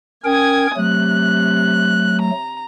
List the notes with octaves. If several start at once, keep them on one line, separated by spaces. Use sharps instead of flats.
C#4 A#4 G5 G#5 D#6 G#6
C3 F#3 A3 F#6
A#5